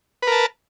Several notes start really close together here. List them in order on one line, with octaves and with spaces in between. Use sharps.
B4 A#4 A5